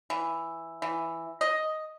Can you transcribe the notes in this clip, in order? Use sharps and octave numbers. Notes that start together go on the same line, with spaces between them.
E3
E3
D#5